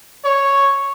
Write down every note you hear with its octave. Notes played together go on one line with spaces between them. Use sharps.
C#5